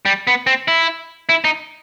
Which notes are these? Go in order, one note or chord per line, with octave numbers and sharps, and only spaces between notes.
G3
B3
C4
E4
E4
D#4